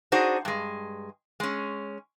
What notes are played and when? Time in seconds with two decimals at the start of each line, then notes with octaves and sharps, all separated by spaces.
0.12 D4 D#4 F#4 G#4 C5
0.45 G2 G#3
1.40 G#3 C#4